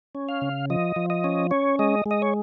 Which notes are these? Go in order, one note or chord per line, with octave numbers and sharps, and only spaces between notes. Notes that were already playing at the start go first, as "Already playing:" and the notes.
C#4
F5
C#3
F3 D#5
F3
D#5
C#4
C#4 C#5
G#3 D#5
G#3
D#5
C#5